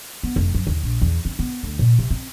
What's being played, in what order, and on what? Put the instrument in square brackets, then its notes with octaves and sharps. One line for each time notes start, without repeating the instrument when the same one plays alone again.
[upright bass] B3
F1
F#2
D#2
A#1
E2
C4
B3
D2
A#2
C3
C4